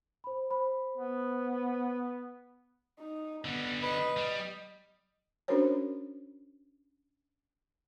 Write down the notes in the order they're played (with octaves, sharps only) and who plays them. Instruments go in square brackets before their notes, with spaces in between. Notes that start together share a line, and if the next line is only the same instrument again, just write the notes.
[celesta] C5 B5
C5 B5
[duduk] B3
[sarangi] D#4
[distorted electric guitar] D3 G3 [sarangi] B3
[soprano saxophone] B4 [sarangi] D#5
[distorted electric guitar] G3
[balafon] C#4 D4 F#4 A#4 C5 C#5